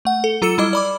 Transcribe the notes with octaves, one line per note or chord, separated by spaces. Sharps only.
A3 F#5
A4
F#3 F4 A4 E6 C#7 E7
G3 E4 D#5 D6
D5 B5 D6